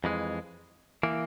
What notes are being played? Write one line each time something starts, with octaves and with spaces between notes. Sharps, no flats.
F2 E3 G#3
E3 A#3